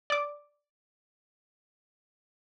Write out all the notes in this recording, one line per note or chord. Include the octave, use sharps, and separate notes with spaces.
D5 D6